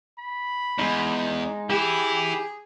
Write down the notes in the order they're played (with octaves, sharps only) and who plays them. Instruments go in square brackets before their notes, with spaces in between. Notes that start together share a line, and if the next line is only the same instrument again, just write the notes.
[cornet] B5
[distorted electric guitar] E2 [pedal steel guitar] G#3 D#4
[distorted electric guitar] E3 E4 [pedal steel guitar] G4 [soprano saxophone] G#4 [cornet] B5